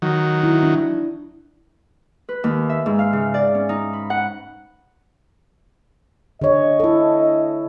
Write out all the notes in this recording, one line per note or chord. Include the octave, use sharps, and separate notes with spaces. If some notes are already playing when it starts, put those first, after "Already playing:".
D#3 F#3
E4
D4
B4
D#2
E5
G#2
F5
C#3
D5
C#4
D#4
B5
F#5
D3 C#5 D#5
E4 A4